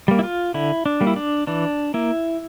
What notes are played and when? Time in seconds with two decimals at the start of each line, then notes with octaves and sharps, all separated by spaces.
0.08 G3 A#3
0.19 E4
0.23 F4
0.54 D3 E4
0.86 D4
1.01 G3 A#3
1.07 E4
1.16 D4
1.47 E3 D4
1.94 A#3 E4